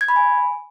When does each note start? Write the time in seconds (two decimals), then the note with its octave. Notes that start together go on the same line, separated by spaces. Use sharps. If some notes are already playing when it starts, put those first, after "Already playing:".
0.01 G#6
0.08 B5
0.16 G#5